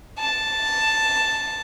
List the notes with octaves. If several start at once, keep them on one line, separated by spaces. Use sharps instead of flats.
A5